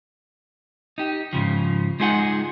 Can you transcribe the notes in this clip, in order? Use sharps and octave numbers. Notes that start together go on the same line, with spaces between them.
D#4 G4
G#2 C#3 F3
G#3 D#4 F4 G#4 D#5 F#5